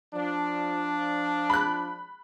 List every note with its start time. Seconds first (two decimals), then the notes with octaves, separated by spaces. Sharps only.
0.13 F3 D4
1.50 B5 F#6